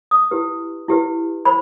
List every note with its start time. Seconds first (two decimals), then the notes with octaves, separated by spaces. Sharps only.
0.11 D#6
0.31 E4 G4 B4
0.88 E4 G4 B4
1.45 C5 B5